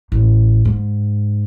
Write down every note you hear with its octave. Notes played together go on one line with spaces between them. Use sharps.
A1
G#2